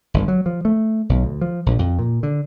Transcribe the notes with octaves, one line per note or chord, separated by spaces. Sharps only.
G1
F#3
F3
A3
B1
D2
F3
A#1
F2
A#2
D3